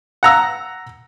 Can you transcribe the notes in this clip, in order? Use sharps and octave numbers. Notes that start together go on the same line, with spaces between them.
F#5 A#5 E6